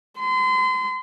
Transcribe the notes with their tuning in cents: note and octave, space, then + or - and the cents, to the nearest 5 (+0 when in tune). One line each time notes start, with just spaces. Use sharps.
C6 -35